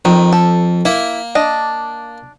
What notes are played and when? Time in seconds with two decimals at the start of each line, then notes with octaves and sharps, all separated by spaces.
0.05 F2 D#3
0.33 A4
0.85 A#3 E4
1.35 D4 D#5